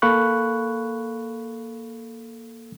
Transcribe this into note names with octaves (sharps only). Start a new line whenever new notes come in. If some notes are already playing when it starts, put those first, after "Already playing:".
A#3 A4 F5 B5 C#6 F#6